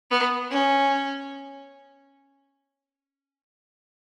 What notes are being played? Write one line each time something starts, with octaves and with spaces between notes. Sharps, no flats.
B3
C#4